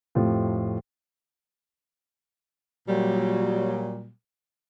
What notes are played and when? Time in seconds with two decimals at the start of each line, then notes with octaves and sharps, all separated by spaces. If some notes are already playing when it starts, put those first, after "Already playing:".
0.15 F2 A2 A3 C4 F4 G4
2.88 A#2 F#3 G3